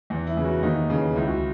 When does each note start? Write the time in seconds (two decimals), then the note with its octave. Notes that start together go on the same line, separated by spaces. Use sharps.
0.10 E2
0.27 E4
0.37 C#3 E3
0.44 F#4
0.62 D#2 D#4
0.90 C#3 E3
1.16 C#2 E4
1.27 F#4